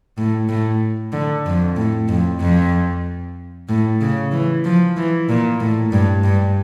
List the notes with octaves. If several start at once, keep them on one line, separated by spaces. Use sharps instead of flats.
A2
A2
D3
F2
A2
F2
F2
A2
C#3
E3
F3
E3
A#2
A2
G2
G2